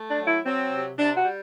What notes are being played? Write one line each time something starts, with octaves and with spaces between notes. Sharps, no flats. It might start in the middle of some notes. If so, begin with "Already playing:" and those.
Already playing: A3
D4
F#3
E4
F#3 C4
C3
C3 D4
F#4
G3